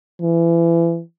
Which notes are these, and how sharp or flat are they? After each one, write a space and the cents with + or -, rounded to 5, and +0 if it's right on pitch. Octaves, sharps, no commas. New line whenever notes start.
E3 +30